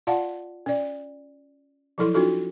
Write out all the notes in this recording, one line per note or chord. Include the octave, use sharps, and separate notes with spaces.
F4 D5 F5 F#5 A5
C#4 D5
F3 F#3 E4 A4 C6
C#4 D#4 F4 F#4 A4